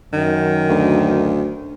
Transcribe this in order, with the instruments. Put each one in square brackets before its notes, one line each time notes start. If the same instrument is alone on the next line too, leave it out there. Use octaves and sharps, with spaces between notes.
[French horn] F#2 [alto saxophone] D#3
[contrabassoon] D2